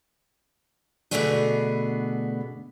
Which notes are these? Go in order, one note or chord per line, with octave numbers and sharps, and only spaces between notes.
B2 D3 A3 B3 D4 G#4